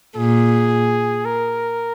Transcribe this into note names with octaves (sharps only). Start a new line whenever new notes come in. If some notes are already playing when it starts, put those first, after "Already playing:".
A#2 G#4
A#4